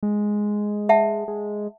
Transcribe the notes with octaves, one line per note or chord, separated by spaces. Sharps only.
G#3
E5 F#5 A5
G#3